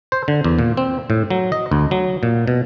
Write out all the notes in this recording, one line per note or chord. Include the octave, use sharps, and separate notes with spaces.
C5
D3
E2
A#2
C4
A2
F#3
D#5
D2
F#3
A#2
B2